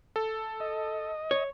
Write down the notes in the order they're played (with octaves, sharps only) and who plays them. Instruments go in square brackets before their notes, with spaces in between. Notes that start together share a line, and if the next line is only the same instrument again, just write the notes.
[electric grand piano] A4
[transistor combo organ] D#5
[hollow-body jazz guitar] C#5